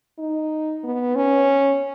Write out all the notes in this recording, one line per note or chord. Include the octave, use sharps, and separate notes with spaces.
D#4
B3
C#4